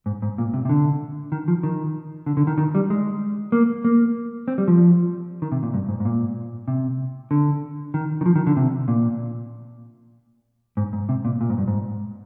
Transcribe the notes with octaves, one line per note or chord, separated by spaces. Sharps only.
G#2
G#2
A#2
C3
C3
D3
D#3
F3
D#3
D3
D3
D#3
D#3
G3
G#3
A#3
A#3
C4
G3
F3
D#3
C3
A#2
G2
G#2
G#2
A#2
C3
D3
D#3
D#3
F3
D#3
D3
C3
A#2
G#2
G#2
C3
A#2
A#2
G#2
G2
G#2